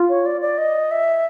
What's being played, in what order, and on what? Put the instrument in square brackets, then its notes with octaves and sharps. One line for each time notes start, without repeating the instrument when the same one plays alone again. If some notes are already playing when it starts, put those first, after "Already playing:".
Already playing: [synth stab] F4
[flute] C#5
D5
D5
D#5
E5